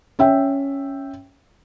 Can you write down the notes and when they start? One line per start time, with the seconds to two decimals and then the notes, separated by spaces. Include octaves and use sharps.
0.19 C#4 E5 G5